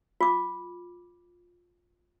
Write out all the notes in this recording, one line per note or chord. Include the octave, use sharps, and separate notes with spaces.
F4 D6